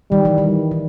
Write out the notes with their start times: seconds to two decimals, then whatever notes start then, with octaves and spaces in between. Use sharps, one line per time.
0.11 D#3 G3
0.25 E3
0.38 D#3
0.71 D#3